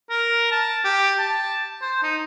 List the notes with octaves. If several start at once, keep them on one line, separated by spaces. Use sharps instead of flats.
A#4
A5
G4
A5
C5
D#4